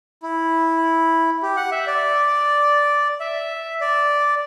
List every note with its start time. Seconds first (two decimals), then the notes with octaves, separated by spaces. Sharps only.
0.23 E4
1.42 G4
1.57 F#5
1.72 E5
1.87 D5
3.20 E5
3.81 D5